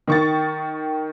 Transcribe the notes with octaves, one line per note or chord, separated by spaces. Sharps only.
D#3 C#6 A6